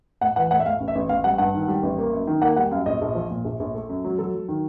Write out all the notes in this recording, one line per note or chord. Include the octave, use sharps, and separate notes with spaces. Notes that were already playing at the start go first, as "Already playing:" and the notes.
A2 F#5
E3 F#5
A2 F#5
E5
A2 F5
A1
E5
A1
A1 F5
G3 F#5
G2 F#5
D#3
G3
A1
A#3
F#2
D#3
A#3 F#5
G3 F#5
F#2 F5
A#1 D#5
A#1
F3
A#2
A#1
A#1
A3
F#2
F#3
F#3 A4
F#3
D#3